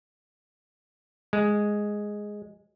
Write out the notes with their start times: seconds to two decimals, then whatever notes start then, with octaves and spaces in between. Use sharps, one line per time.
1.33 G#3